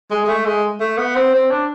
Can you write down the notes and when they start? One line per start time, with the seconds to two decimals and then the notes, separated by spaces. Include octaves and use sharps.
0.10 G#3
0.24 G#3
0.27 A3
0.45 G#3
0.80 A3
0.98 B3
1.15 C4
1.34 C4
1.50 D4